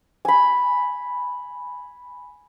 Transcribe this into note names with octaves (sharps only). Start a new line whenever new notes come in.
G#5 B5